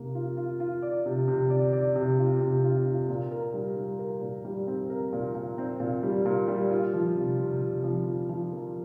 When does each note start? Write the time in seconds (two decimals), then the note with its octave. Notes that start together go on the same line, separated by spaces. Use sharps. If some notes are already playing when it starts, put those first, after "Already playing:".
Already playing: C3 A#3
0.15 F4
0.37 F4
0.60 F4
0.82 D5
1.06 C3
1.28 C3
1.50 D5
1.73 D5
1.96 C3
2.19 F4
2.41 C3
2.64 F4
2.86 F4
3.09 A#2
3.31 A#4
3.54 G3
3.77 G3
3.99 A#4
4.21 A#2
4.45 G3
4.67 C4
4.90 A#4
5.13 A#2
5.35 A#2
5.58 C4
5.80 A#2
6.03 G3
6.26 A#2
6.48 G3
6.71 F4
6.93 F3
7.17 C3
7.39 C3
7.61 C3
7.84 F3
8.06 F4
8.29 F3
8.52 A#3